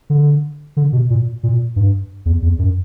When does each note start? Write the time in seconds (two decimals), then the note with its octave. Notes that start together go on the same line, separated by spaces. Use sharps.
0.10 D3
0.77 D3
0.93 B2
1.10 A#2
1.43 A#2
1.76 G2
2.26 E2
2.42 E2
2.59 F#2